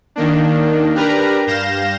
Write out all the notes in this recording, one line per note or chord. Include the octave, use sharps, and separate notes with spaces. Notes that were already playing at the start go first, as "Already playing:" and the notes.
D#3 A#3 D4
D4 G4 A#4 B4 A#5
G2 F5 G6 A#6 E7